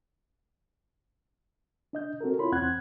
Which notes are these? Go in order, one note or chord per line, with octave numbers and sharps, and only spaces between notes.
D4 D#5 G6
C4 F#4 A4 A#4
E4 F4 C#5 B5 C6
E2 C4 F#5 F#6 G#6